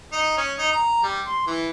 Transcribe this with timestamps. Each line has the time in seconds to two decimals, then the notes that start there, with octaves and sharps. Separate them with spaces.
0.12 D#4
0.37 C#4
0.58 D#4
0.72 A#5
1.03 G3
1.26 C6
1.46 E3